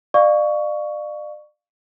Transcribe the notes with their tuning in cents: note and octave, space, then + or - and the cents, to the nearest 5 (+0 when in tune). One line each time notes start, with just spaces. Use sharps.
D5 +35 F5 +5 C#6 +15